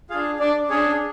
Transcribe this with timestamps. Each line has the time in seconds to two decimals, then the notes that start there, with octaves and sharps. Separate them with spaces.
0.10 D4 F4 G#4 F5
0.40 D4 D5
0.70 C#4 D4 G#4 C#5